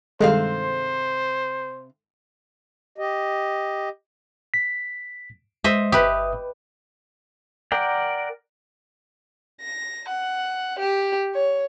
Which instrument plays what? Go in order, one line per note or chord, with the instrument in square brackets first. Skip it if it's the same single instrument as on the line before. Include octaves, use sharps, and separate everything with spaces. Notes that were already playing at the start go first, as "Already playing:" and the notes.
[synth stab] G2 D#3 G#3 [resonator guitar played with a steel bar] C3 C4 F5 [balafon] A4 [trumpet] C5
[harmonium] G4 D#5
[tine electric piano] B6
[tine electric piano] G#3 [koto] C5 D#5 E5
[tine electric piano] G1 E5 D#6 [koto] G4 B4
[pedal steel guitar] A#4 D5 F#5 G5
[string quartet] A#6
F#5
G4
C#5